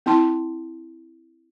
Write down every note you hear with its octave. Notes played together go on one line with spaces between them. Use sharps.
C4 E4 A5 C6